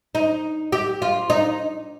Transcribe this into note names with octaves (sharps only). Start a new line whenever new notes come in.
D#4
G4
F4
D#4